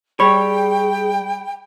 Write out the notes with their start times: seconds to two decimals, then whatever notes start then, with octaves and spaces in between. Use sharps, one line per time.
0.20 G3 G#4 C#5 G5 B5